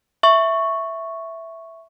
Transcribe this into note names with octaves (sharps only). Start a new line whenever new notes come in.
E5 C#6